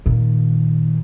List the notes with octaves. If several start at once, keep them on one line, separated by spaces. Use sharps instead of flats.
A#2 D#3